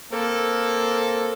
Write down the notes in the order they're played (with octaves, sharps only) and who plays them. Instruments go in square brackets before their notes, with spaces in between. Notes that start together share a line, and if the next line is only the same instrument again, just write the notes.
[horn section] A#3 C4 A4